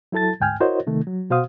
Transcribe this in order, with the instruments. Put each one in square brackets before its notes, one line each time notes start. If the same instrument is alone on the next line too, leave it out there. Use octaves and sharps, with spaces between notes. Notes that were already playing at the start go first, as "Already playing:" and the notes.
[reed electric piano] F#3 E4 A4 A5 A6
D2 G#2 G5 G#5 F6
E4 F#4 A#4 C5 C#5 D#5
C3 D#3 A3
F#3
B2 F#4 C5 F5 D#6